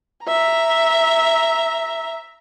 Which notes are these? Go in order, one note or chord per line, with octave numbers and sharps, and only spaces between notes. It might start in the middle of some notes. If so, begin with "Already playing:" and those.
E5 A#5